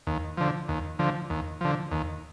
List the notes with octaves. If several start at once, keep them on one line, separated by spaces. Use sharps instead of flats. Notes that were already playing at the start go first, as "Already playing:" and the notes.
D#2
D3 F3
D#2
D3 F3
D#2
D3 F3
D#2